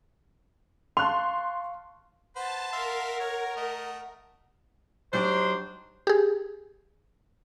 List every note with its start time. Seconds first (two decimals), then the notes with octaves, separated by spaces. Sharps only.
0.97 F5 A5 C6 C#6 F#6 F7
2.36 B4 C5 F#5 A5
2.72 A#4 E5 F5 C6
3.20 C#5
3.57 A3 D#5
5.13 F#3 D4 D#4 G4 C5
6.07 G4 G#4